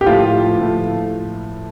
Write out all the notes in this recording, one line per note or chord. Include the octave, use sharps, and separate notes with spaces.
G4
A2 F3 A3 E4 F4
A2 F3 A3 E4